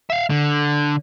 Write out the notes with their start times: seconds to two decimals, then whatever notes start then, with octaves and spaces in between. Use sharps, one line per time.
0.10 E5 F5
0.30 D3